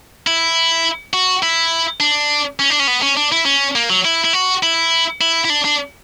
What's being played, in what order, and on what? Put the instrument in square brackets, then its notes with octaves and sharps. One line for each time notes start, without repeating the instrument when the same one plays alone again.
[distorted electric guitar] E4
F#4
E4
D4
C#4
D4
C#4
B3
C#4
D4
E4
C#4
A#3
F#3
E4
E4
F#4
E4
E4
E4
D4
D4